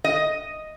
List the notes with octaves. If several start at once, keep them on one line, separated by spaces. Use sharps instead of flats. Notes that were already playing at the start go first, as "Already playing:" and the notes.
D#5